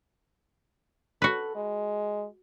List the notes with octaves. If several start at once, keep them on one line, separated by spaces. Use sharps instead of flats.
F#4 A4 B4
G#3